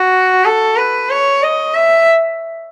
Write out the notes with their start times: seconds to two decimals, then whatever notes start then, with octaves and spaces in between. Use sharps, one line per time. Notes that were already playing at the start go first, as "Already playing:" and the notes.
Already playing: F#4
0.44 A4
0.77 B4
1.10 C#5
1.42 D#5
1.74 E5